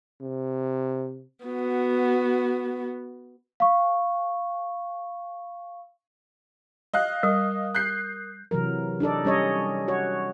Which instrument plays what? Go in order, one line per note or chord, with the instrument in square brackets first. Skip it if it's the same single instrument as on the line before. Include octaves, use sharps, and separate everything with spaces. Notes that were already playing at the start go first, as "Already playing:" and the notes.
[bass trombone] C3
[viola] B3 F#4
[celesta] F5 C#6
[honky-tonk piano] D#5 F5 F#6
[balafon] G3 [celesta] A#4 D#6
[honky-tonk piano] F#6 G6 C7
[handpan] C3 E3 F#3 A#4
D4 D#4 A4 D5
G3 C#4 C#5 D#5
F#4 C#5